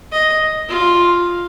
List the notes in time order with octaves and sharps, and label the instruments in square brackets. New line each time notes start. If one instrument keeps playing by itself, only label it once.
[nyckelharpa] D#5
F4